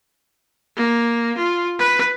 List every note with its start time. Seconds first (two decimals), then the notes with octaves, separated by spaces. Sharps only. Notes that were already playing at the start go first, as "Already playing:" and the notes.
0.77 A#3
1.37 F4
1.79 B4